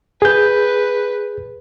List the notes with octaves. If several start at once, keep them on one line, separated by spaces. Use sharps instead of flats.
G#4 B4 G6